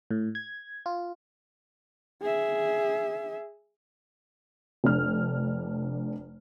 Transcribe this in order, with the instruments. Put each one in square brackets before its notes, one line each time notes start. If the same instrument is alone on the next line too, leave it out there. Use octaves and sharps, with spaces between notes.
[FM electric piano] A2
G#6
F4
[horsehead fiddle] G#4 E5
[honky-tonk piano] F1 D4 F6